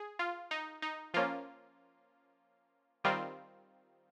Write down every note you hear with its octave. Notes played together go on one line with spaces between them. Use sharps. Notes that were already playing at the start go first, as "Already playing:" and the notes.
Already playing: G#4
F4
D#4
D#4
F3 A#3 C#4 F4
D#3 G3 C4 F4